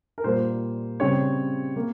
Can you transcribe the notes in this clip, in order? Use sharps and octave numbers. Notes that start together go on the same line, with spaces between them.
A#4
A#2 G3 A#3 C5
C#3 G3 C4 C#5
A#3